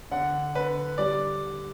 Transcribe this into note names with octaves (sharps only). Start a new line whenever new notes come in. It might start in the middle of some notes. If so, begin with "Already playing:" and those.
D3 F#5
D3 B4
G3 D5